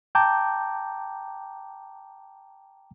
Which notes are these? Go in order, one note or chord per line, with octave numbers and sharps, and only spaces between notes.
G5 A5 A#5 D6 G6